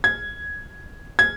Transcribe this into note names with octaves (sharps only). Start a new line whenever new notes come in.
G#6
G#6